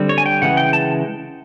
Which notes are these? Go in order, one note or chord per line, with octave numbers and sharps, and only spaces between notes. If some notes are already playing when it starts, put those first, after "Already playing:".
Already playing: D3 G3 C4
C#5
G#5
G5
C#3 E3 G#3 F#5
G5
A5